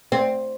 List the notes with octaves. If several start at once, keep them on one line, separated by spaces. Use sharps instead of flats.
C4